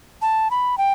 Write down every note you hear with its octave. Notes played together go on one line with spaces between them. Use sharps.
A5
B5
G5